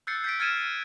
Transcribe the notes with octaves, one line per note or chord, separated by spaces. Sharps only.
E6 F#6 G6 A6 C7 C#7
G6 B6 D7
F6 G#6 A6 C#7 D#7 E7